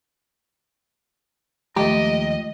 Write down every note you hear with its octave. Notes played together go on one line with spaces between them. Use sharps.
D#2 F3 G#3 A3 G4 D#5 A#5